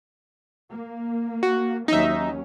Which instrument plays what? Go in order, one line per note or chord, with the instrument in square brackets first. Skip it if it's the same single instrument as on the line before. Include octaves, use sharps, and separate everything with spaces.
[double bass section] A#3
[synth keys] F#4
[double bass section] D#2 F#3 C#4 [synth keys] D#4 E5